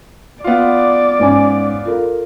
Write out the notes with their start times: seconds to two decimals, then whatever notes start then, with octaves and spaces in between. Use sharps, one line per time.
0.44 B3 F4 D5
1.19 G#2 C#4 G#5
1.85 F4 A4 A#4